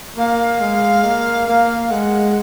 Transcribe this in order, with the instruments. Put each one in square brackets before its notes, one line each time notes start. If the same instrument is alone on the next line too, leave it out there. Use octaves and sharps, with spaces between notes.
[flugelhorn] A#3 [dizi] F5
[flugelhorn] G#3
A#3
A#3
[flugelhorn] G#3 [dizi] F#5